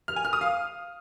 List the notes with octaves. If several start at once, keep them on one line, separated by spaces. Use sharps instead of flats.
F6
G#5
F6
D#6
F5